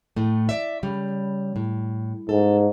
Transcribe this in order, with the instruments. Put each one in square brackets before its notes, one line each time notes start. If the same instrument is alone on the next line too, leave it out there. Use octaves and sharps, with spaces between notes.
[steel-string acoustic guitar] A2 A3
D5 E5
C#3 G3
A2
[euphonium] G#2 [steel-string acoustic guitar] A4